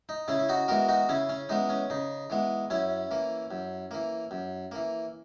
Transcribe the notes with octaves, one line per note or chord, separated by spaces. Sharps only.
D#4
C#3 C#4 E4
E4
D#4 F#4
E3 G#3 B3 F#4 A#4
D#4 F#4
C#3 C#4 E4
C#4
E3 G#3 B3 D#4
C#4
C#3 D#4
E3 G#3 B3
F#2 C#4 E4
E3 A#3
F#2
E3 A#3
F#2
E3 A#3